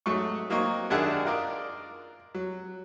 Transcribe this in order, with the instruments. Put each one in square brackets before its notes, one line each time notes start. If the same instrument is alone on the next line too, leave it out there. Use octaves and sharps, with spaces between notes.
[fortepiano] G#2 F#3 A3 C#6
F#3 A#3 C4 D#4 C#5
F#2 D#3 D4 G#4 E5 F#5
F4 A#4 D5 D#5
F#3